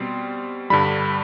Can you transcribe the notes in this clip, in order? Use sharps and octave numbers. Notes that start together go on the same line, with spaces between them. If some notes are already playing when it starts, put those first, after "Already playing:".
Already playing: B2 G3 C4 C6
G2 D3 G3 B5